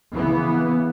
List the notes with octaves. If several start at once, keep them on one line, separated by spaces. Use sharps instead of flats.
C#3 E3 B3